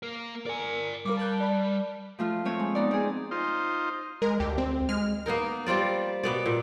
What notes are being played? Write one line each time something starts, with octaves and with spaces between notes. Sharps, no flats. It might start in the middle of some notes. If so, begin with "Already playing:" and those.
A#3 A#4
A#4 D5 G#5
G3 A#4 F5 D6
A5 F#6 G6
D5 B5
F3 A3 F4
A3 C4 C#5
G#3
B3 D#4 D5
C4 G#4
D#4 F4 C5
G#3 A#4
D2 G4
C4
G#3 F6
A#3 B3 D#4 A#4
G3 C4 F4 D5
B2 B3 D5
A#2